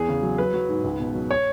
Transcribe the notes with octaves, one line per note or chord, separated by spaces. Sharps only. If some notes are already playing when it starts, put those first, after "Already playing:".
Already playing: E2 G#4
C#3
F#3
F#3 B4
F#3
G#2
C#2
B2
F#3
C#5